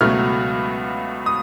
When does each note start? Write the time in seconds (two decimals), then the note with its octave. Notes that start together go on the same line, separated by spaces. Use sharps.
0.01 C#2 B2 F#3 A3 F6
1.26 D#6